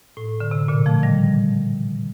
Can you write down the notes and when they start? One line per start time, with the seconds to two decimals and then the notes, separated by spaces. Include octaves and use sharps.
0.17 A2
0.40 D3
0.51 C3
0.68 A#2 D3
0.86 F3 A3
1.03 D#3 G3